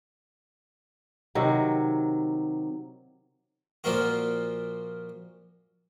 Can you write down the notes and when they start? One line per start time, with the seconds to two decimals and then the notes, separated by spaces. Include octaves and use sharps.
1.35 C3 D#3 F#3
3.84 A#2 F3 A#3 F4 F#4